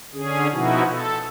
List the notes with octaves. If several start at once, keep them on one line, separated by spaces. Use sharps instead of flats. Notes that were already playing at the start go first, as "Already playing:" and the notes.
D3 C#4 G#4
B2 F3 B3 D#4 E4 F#4
A4